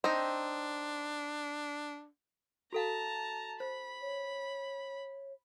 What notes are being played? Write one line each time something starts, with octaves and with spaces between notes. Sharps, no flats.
C4 D4 D#4
F#4 A4 F5 A5 A#5
C5 B5
C#5